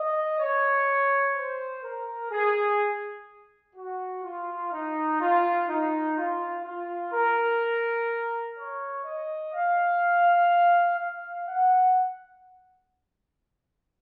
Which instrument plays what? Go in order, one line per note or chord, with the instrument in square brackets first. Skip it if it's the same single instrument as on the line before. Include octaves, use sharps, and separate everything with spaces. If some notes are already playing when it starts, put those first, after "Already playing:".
Already playing: [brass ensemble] D#5
C#5
C5
A#4
G#4
F#4
F4
D#4
F4
D#4
F4
F4
A#4
C#5
D#5
F5
F5
F#5